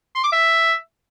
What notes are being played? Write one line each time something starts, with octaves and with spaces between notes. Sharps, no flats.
C6
D6
E5